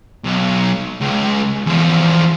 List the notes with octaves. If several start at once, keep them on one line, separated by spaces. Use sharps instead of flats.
B1
C#2
E2 F3